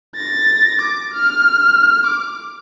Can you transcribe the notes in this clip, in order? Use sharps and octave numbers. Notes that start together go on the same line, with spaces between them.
A6 A#6
D6
F6
D6